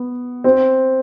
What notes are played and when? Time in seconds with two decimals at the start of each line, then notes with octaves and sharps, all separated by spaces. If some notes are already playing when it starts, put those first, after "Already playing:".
Already playing: B3
0.44 C4